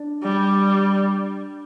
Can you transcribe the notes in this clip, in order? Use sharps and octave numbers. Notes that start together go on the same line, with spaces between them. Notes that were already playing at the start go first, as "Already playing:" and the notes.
Already playing: D4
G3